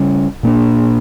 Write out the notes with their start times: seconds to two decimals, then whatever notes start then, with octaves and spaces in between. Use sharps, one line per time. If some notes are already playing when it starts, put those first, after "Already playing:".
Already playing: C#3 G3 C#4
0.43 A#2 A#3 D4